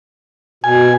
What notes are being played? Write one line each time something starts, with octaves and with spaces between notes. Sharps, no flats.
B2 G#5